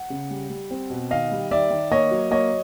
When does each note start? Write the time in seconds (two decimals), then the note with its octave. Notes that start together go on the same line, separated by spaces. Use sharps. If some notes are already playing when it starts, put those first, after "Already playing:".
Already playing: F#5
0.10 C#3
0.30 G3
0.50 G3
0.71 C4
0.90 B2
1.11 D#3 D#5 F5
1.31 G3
1.51 D#3 D5 E5
1.70 D#3
1.91 A#3 C#5 D#5
2.11 F#3
2.31 A#3 C#5 D#5